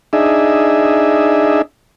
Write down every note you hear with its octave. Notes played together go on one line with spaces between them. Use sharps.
D4 D#4 G#4 E5